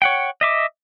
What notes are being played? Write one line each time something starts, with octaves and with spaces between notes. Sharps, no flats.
C#5 F#5 G5
D#5 E5 D6